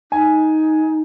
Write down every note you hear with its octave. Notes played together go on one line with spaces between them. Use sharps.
D#4 G#5